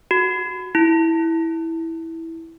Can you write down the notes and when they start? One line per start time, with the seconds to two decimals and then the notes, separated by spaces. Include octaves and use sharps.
0.11 F#4
0.75 E4